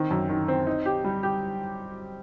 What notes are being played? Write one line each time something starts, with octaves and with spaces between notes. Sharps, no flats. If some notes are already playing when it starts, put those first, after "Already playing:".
Already playing: D#3 C4
F#2
D#3
C4
D#4
G4
G3
G4